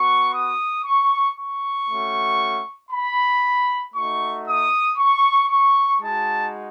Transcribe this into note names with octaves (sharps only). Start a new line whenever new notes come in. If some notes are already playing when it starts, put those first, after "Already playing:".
Already playing: B3 F#4 C#6
D#6
C#6
C#6
A3 C#4 F#4
B5
A3 D#4 F#4 C#6
D#6
C#6
C#6
G#3 D#4 F#4 A5